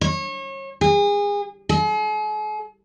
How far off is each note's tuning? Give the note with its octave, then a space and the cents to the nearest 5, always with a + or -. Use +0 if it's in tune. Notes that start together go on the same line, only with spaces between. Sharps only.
C#5 -35
G#4 -30
G#4 +45